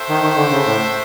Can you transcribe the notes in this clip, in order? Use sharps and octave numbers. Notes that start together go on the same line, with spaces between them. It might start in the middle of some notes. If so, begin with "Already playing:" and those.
Already playing: F#4 A4 C5 E5 G5
D#3
D#3
D3
C#3
A2